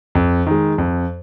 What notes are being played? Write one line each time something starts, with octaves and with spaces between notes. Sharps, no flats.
F2
D#3 G#3
F2